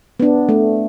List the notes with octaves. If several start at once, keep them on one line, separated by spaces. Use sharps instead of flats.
B3 D4
A3